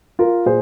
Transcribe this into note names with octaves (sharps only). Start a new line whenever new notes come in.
F4 A#4
A#2 G#4 C5